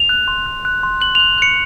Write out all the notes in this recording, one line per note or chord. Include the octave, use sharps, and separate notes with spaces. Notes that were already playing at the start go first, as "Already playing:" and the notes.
Already playing: F7
F#6
C6
F#6
F#6
C6
F#6 F#7
F#6 F7
F#6 C#7